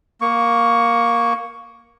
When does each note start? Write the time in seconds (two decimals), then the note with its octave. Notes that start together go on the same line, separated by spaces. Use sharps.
0.21 A#3 C#6